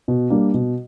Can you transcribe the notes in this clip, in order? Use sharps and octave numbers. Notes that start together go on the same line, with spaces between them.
B2
G3 A#3 D4
B2